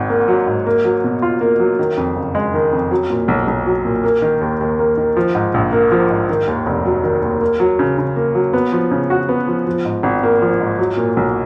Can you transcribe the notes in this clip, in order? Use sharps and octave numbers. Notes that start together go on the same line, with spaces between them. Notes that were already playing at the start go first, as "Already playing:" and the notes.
Already playing: G#1 G#2
A#3
F#3
G#2
A#3
F#3
B2
F4
A#3
F#3
D#3
F2
F#1
G#3
D#3
F2
F#3
A#2
B1
B1
F#3
A#2
A#3
D#3
D#2
D#2
A#3
D#3
F3
G#2
A#1
A#3
F3
G#2
D#3
D#2
F1
F#3
D#3
D#2
A#3
F#3
C#3
C#3
A#3
F#3
B3
F3
C#3
F#4
B3
F3
F3
G#2
G#1
A#3
F3
G#2
F#3
A#2
B1